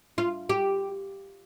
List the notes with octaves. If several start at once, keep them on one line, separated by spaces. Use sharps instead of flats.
F4
G4